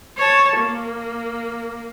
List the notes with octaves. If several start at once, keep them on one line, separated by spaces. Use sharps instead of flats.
C#5 A5
A#3